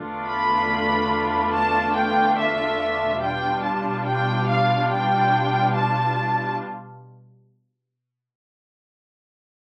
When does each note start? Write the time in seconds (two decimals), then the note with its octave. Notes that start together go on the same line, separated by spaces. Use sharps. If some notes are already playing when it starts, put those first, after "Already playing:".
Already playing: E2 D3 A3 D4 F4
0.26 B5
1.53 A5
1.96 G5
2.38 E5
3.22 B2 G3 D4 F4 G5
3.65 A5
4.07 G5
4.48 F5
4.91 G5
5.75 A5